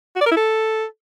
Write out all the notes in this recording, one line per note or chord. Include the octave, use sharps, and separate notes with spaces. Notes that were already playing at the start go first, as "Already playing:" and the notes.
F#4
D5
A#4
E4
A4